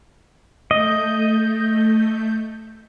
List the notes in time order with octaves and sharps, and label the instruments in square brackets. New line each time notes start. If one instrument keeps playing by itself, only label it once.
[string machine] A3 G6 [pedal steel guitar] D#5